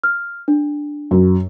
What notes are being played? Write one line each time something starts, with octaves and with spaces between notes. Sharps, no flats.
F6
D4
F#2